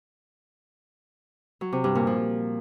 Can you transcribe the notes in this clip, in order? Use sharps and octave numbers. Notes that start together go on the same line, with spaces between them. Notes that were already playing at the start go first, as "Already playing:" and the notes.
F#3
C3
G2
A#2
F3